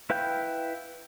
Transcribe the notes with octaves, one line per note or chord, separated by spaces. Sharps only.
E4 B4 F5 G5 G6